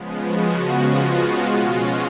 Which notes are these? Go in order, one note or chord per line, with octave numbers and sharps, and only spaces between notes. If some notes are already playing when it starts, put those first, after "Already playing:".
Already playing: C#3 F3 G#3 B3
F#4
F4
F4
B2 G#3 C#4 F4 F#4